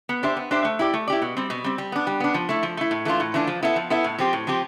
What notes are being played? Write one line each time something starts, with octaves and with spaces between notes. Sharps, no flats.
B3
D4 G4 C5 E5
B3
D4 G4 C5 E5
A3
E4 G4 D5
A3
E4 G4 D5
B2
G3 C4
B2
G3 C4
G3
B3 D4
G3
B3 D4
F3
A3 E4
F3
A3 E4
A2
E3 A3 D4 F4
A2
E3 A3 D4 F4
F3
B3 E4 A4 E5
F3
B3 E4 A4 E5
A2
F3 C4 G4
A2
F3 C4 G4